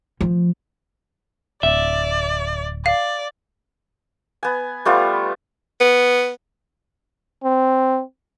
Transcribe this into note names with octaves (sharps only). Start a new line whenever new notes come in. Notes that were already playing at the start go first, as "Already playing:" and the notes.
F3
D1 D5 E5
D5 F5
B3 G#5
G3 A3 B3 F4
B3
C4